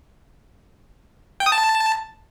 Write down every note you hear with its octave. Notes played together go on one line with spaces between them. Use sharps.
G5
D#6
A5